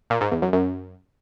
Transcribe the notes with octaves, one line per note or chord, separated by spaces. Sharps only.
A#2
G#2
E2
F#2
F#2